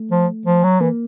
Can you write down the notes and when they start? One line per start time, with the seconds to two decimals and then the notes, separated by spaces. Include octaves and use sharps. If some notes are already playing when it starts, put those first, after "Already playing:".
Already playing: A3
0.11 F3
0.46 F3
0.64 F#3
0.80 E3 A#3